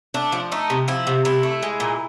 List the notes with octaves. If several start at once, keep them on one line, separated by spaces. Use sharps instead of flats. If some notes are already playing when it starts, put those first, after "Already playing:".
A3 D4
F3
A3 D#4
C3
F3 E4
C3
C3 E4
A3
G#3
A#2